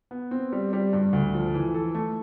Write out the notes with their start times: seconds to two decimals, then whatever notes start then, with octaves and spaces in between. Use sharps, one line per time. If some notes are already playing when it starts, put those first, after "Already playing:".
0.11 B3
0.31 C4
0.52 G3
0.73 G3
0.93 G2
1.13 D2
1.34 F3
1.54 E3
1.74 A4
1.95 A3